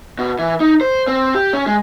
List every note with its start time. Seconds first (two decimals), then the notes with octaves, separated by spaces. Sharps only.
0.19 B2
0.39 E3
0.60 D#4
0.81 C5
1.07 C4
1.35 G4
1.53 C#4
1.66 G#3